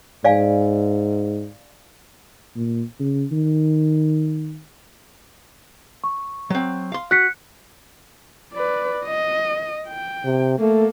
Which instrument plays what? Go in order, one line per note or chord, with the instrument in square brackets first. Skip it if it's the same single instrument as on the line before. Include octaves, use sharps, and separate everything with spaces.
[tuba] G#2 [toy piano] D5 F5 G#5
[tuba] A#2
C#3
D#3
[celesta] C#6
[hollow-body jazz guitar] F#3 C4
F5 C6
[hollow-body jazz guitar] F#4 [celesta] F#6 B6 C#7
[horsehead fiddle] B4 D5
D#5
G5
[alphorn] C3
[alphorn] A3 [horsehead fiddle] A#3 A4